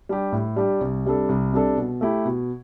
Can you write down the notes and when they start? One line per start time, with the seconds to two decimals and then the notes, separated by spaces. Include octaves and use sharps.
0.09 G3 D4 G4
0.32 A2
0.56 G3 D4 G4
0.81 C2
1.06 C3 G3 D4 A4
1.29 C2
1.53 C3 G3 D4 A4
1.77 B2
2.01 A3 E4 G4
2.25 B2